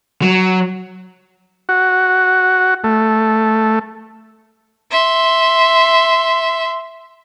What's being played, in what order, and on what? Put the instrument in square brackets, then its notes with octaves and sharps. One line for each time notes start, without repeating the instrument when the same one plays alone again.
[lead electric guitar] F#3
[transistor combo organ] F#4
A3
[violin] E5 C6